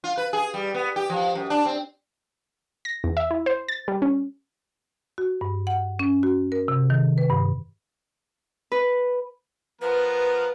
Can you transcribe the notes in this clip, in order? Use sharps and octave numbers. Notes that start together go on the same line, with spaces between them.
F4
B4
G#4
G3
B3
G4
F3
F#2
D4
C4
A#6
E2
E5
E4
C5
A6
G3
C#4
F#4
G2
F#5
C#4
F#4
A#4
C3
D#3
B4
G2
B4
F3 B3 A#4 B4